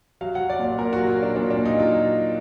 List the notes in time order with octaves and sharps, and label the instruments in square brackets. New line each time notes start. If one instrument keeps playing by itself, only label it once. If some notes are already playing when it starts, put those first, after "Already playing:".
[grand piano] F#3 F5
F#5
F#3
D5
A#2
D5
A#2 A#4
F#4
F#3
F4
F#3
D4
A#2 D4
D4
A#2
D#4
F#3 F4